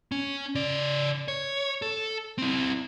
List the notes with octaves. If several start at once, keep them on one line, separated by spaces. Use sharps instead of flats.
C#4
C#3 D5
C#5
A4
C4 E4